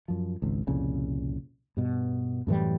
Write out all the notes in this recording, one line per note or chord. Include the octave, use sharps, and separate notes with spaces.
F#2 F3
G#1 C#2
C2 F2 A#2 C#3
G2 B2
F#2 A2 E3 G3